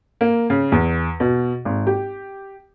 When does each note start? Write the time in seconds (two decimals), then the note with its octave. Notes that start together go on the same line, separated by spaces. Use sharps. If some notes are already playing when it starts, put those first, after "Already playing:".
0.21 A#3
0.50 C#3
0.72 E2
1.20 B2
1.65 G#1
1.87 G4